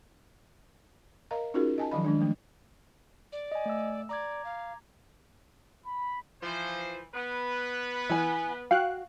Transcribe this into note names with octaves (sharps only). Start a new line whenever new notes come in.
A#4 D#5 F5 A#5
C#4 D#4 F4 F#4 G#4 A#4
D#5 G#5 A5
D#3 F3 F#3 D#5 B5
D#3 G#3 D4
F3 A3
D5
D#5 G#5
A3 E6
D5 A#5 D6 G#6
F5
B5
E3 F3 C5
B3 B4
E3 E4 G#5
F#4 F5 G5 F#6